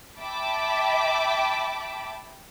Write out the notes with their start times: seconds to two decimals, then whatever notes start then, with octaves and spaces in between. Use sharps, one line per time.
0.20 E5 G5 A5 B5 D6